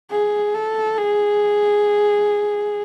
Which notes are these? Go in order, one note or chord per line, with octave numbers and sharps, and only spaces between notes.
G#4
A4
G#4